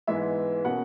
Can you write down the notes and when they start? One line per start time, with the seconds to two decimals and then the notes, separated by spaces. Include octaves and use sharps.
0.07 G#2 E3 G#3 B3 E5
0.64 B2 A#3 C#4 F#5